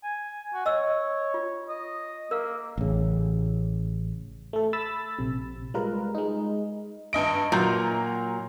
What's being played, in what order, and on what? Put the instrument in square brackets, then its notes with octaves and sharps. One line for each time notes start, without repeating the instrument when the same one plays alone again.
[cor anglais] G#5
F#4
[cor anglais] C#5 [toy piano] D#5 E6
[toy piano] F4
[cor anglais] D#5
[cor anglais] A#3 [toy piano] A#4 F5
[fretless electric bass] A1 C#3
[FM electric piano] A3 A4
B5 E6 A6
A#1 C3
G3 G#3 F4 A#4 B4
G#3 D#4
[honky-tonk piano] G2 D#5 D7
[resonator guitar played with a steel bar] A#2 [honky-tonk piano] F#3 A#5 G6